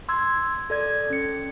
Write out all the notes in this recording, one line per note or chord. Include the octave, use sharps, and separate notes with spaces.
C6 E6 G#6
A4 D5 G#6
C#4 C#7